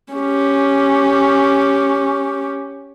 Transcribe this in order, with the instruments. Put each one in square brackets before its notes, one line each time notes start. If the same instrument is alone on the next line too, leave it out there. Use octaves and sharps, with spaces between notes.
[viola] C#4 G4